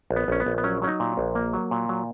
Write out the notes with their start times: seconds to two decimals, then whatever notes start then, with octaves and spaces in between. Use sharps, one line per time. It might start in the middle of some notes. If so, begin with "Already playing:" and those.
0.10 A#1
0.16 B3
0.28 A#1 C#4
0.40 B3
0.46 A#1
0.58 B3
0.64 F#3 C#4
0.82 F#3 C#4
0.88 D#4
1.00 A#2
1.17 A#1
1.35 A#3
1.53 F#3
1.71 A#2
1.89 F#3